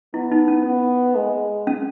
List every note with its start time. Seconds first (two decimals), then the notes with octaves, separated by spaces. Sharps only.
0.14 B3 E4
0.32 D#4
0.48 C#4
0.65 B3
1.15 G#3
1.67 C#4